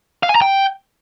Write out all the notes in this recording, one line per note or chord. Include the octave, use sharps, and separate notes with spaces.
F5
G#5
A#5
G5